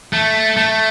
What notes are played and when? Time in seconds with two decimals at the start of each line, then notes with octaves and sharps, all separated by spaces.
0.13 A3
0.56 A3